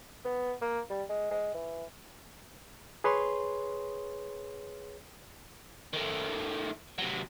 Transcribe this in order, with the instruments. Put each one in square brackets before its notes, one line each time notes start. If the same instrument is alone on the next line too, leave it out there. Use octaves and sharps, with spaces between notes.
[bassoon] B3
A#3
G3
G#3
G#3
E3
[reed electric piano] G#4 B4 C#5 C6
[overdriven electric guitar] D#3 A3
C3 F#3